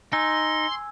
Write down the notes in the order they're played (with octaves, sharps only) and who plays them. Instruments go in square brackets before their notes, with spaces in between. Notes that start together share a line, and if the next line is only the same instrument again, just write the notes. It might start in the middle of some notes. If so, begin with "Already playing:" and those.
[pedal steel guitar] D#4 [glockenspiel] G#5 E6 G#6 [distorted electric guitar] C6